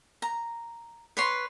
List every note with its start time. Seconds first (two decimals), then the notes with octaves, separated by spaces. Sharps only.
0.22 A#5
1.17 B4 C#5 C6